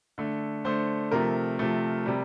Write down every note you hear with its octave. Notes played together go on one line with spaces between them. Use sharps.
D3 A3
D3 A3 C5
C3 F3 A3 A#4
C3 F3 A3
C3 G3